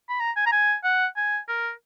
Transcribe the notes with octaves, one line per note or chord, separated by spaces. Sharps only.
B5
A#5
G#5
A#5
G#5
F#5
G#5
A#4